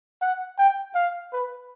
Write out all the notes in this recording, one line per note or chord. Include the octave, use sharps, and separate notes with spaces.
F#5
G5
F5
B4